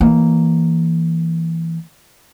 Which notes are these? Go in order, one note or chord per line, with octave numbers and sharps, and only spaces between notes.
E3 A#3